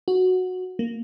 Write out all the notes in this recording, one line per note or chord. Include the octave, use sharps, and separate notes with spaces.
F#4
A#3